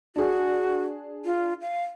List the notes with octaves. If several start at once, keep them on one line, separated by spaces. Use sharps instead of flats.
D4 F#4 G#4
F4
F5